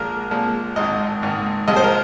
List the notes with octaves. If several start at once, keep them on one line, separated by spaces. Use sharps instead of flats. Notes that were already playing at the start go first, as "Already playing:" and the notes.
Already playing: A#1 A#2 F3 G#3 A#4
A#1 A#2 F3 G#3
G#1 G#2 D#3 D#5
G#1 G#2 D#3
C2 C3 F3 G#3 D#5
C5
A#4